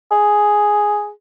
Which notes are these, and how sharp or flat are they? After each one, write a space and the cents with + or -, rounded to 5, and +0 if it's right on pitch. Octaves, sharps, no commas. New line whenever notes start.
G#4 +0